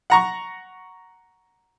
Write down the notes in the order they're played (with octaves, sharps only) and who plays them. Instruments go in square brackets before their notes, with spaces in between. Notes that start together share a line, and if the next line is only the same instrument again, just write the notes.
[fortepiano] F#5 A#5 C#6